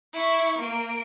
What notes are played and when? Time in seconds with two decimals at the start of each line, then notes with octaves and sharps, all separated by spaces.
0.14 E4 C#6
0.59 A#3 D7